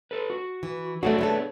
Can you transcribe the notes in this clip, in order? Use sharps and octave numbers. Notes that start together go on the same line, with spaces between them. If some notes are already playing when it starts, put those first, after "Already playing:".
A4 B4
F#4
E3
A3 A#3 D4 F#4 G#4 C#5
A3 B3 A4